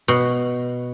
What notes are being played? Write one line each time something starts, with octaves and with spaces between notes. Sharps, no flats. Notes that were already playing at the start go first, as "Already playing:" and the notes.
B2